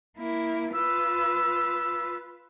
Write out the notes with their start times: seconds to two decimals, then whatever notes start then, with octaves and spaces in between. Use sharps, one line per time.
0.17 A#3 E4
0.73 F4 B4 E6